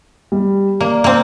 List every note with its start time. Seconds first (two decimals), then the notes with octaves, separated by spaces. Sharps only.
0.32 G3
0.80 A#3 D5
1.04 A#3 C4